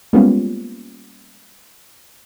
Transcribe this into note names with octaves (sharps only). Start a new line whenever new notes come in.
G3 G#3 A#3 B3 C#4 F4